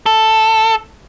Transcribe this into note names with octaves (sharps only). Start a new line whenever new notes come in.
A4